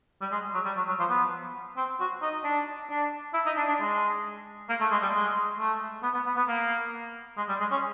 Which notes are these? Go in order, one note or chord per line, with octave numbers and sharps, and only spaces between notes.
G3
G#3
F#3
G3
F#3
F#3
F3
B3
C4
F#4
D#4
D4
D4
E4
D#4
D4
D4
G#3
A#3
A3
G#3
G3
G#3
A3
B3
B3
B3
B3
A#3
G#3
G3
G#3
C#4